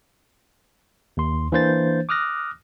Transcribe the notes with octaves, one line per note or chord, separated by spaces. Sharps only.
D#2 C6
E3 A#3 D4 C5 G6 A6
D6 D#6 F6 F#6 A#6